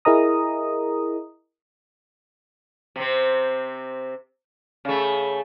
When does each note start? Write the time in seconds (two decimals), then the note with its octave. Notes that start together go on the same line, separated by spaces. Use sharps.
0.05 E4 G#4 A#4 D#5 A#5 D#6
2.96 C3 C4
4.85 C#3 A3